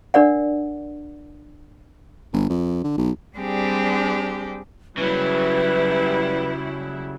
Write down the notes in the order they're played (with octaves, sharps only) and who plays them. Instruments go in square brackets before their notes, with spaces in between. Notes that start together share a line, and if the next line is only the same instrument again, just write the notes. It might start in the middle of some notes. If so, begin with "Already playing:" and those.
[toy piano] D4 A#4 D5 F#5
[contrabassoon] G1
F2
D3
B1
[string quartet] G3 C4 D4 G4 G#4
[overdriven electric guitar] C#3 F#3 [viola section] G3 E4 [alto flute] B4